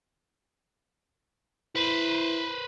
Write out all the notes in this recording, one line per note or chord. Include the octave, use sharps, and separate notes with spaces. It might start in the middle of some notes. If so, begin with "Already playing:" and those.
E4 B4 C5